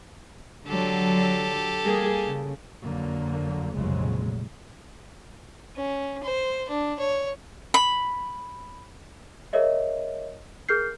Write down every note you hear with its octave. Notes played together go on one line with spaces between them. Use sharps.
D3 F#3 G4 A4
G3 A#3 G#4
C#3
F2 D3 F#3 A#3
F1 A#1 A#2 C#3 F#3 G#3
C#4
C5
D4
C#5
B5
G#4 A#4 C#5 D#5 E5
G#4 A#4 F6 G6 C7